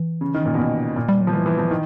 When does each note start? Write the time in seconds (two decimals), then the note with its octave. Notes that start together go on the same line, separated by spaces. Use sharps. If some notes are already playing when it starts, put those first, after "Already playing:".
Already playing: E3
0.21 C#3
0.34 D#3
0.46 A#2
0.54 B2
0.59 A#2
0.96 A#2
1.09 G3
1.21 F#3
1.27 F3
1.33 E3 G3
1.46 E3
1.58 F3
1.67 E3
1.71 D#3